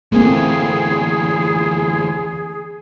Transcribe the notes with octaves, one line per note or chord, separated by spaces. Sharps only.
D2 E3 A3 A#3 C4 G#4